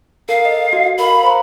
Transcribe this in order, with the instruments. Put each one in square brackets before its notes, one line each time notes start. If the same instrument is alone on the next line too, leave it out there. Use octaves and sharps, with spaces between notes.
[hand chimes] A4 A#4 [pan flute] F5
[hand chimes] D#5
F#4
[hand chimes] A#4 F5 [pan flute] B5
[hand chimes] C5 A#5 C6